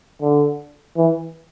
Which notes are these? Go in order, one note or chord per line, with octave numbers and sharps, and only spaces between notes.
D3
E3